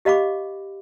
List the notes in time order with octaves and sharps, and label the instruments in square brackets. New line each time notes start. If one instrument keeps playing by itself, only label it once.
[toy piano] G4 D#5 F5 B5 D6